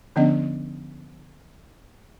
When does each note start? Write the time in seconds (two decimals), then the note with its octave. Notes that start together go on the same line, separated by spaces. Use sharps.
0.16 D3 F3 B3 C#4 D4 D#5